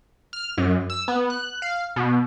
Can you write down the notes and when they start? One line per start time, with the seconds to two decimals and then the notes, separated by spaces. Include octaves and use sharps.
0.33 F6
0.58 F#2
0.90 E6
1.08 B3
1.30 F#6
1.62 F5
1.96 B2